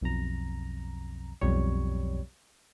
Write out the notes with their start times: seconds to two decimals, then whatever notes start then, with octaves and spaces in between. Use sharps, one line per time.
0.01 B1 F2 A#5
1.41 B1 F2 G3 C#5